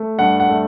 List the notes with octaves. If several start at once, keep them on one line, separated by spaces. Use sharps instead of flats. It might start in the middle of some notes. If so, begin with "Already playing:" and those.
Already playing: A3
G2 F#5
F#5
A3